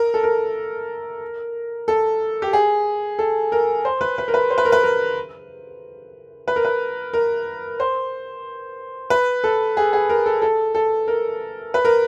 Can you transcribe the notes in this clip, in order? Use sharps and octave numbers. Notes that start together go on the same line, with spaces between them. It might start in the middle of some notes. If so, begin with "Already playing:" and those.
Already playing: A#4
A4
A#4
A4
G4
G#4
A4
A#4
C5
B4
B4
A#4
B4
C5
B4
A#4
B4
A#4
B4
A#4
B4
A#4
C5
B4
A4
G#4
G#4
A#4
A4
A4
A4
A#4
B4
A#4